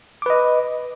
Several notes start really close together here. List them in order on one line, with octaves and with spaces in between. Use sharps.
D6 B4 D#5